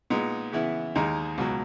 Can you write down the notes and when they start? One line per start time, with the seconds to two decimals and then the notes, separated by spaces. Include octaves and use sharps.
0.10 A#2 G#3 B3 D#4
0.52 C#3 E3 B3 E4
0.95 D#2 D#3 G#3 D#4
1.38 C#2 B2 F#3